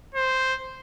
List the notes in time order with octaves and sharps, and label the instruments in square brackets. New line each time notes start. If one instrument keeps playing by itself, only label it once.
[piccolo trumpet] C5